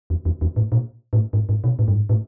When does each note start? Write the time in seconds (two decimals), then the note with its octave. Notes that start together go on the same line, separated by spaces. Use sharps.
0.10 E2
0.25 E2
0.41 E2
0.56 A2
0.72 A#2
1.13 A2
1.33 G#2
1.49 G#2
1.64 B2
1.79 A2
1.88 G2
1.94 G#2
2.09 A2